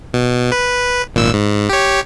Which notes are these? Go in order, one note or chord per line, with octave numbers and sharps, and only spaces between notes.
B2
B4
G#1 A#2 E6
G#2
G4 C#5